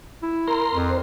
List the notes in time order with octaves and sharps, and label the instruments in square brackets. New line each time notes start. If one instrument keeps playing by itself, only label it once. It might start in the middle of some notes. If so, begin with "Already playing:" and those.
[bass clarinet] E4
[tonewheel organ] A#4 A#5 C6
[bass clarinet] F2
[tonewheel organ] C5